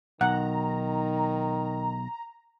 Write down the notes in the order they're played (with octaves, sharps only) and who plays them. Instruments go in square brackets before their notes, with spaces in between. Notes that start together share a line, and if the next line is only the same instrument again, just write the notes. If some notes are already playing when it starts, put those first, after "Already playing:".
[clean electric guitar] B1 [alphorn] D#3 [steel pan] F#5 [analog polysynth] A#5